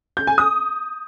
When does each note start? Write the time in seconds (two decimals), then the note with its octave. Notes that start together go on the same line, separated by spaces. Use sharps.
0.17 G6
0.27 G#5
0.38 D#6